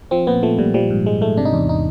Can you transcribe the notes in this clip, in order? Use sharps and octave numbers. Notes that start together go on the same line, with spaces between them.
F3 C4
A#2 B3
F3 A3
A#2 G3
F3 G3
G#2
F3 G#3
G#2 A3
C3 D4
D#4
E2 D4
D#4